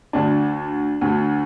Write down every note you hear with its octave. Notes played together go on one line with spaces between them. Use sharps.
D2 D3 D4
D2 D3